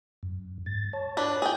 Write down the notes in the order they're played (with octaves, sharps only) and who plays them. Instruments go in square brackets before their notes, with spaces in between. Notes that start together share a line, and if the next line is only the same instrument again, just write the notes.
[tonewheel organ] F#2
G#2 A6
C#5 A5
[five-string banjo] D4 B4
G#4 G5